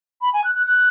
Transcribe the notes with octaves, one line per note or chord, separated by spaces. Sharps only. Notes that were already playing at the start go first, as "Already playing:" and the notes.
B5
G#5
F#6
F#6
F#6